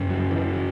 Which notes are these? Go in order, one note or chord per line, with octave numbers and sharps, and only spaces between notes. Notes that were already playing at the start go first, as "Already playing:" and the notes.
Already playing: F#2 C#3
F#3
E3
F#3